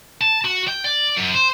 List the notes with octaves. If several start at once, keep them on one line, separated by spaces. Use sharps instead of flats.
A5
F#4
G5
D5
F#2
C5